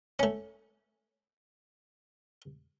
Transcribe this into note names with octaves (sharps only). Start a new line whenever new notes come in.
A3 C#4